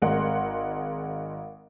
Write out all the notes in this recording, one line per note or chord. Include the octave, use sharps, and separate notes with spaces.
G#1 G#3 A#4 F#5 C6